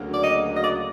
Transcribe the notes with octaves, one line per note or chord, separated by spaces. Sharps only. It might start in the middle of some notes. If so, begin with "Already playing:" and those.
Already playing: D2 C#3 F#3 A#3
D5
D#5
D#5
D5